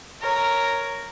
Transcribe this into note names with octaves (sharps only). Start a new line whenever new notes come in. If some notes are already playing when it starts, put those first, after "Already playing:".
A#4 C#5